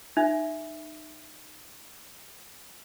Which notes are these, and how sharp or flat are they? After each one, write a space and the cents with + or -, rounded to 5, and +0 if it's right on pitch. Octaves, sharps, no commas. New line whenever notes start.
D#4 -25 E5 +0